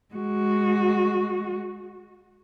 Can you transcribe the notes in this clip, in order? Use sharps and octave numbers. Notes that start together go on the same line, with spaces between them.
G#3 F#4